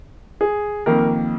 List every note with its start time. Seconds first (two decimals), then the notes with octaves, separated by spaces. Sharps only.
0.41 G#4
0.86 F2 D#3 A#3 A#4